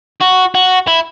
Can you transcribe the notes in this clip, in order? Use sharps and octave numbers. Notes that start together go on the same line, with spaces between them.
F#4
F#4
E4